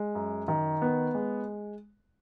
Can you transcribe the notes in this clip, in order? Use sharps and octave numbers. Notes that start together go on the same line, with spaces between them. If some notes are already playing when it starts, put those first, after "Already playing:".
Already playing: G#3
F#2
D#3
B3
G#3